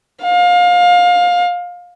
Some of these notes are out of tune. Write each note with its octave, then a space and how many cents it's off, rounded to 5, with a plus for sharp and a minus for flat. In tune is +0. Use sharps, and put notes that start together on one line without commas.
F5 +25